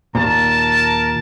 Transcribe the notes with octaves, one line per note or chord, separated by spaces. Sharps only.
D#2 A#2 A#4 A5